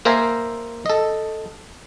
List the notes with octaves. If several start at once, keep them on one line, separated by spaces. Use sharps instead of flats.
A#3 A#4 C5 E5 G#5 A#5
A4 D#5